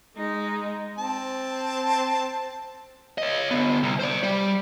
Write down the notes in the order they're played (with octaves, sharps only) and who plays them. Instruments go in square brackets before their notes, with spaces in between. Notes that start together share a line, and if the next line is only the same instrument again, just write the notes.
[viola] G#3 D#4
[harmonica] C4 A5
[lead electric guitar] C#5 D#5
D3 B3
C2
C5 D5
G3